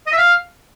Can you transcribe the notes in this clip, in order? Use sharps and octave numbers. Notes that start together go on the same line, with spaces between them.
D#5
E5
F5